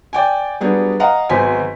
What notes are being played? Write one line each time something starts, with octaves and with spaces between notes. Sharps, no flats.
D5 G5 G#5
F#3 G3 B3 D4 G#4
D#5 F5 F#5 A#5
G#1 F#3 B3 C5 G#5 B6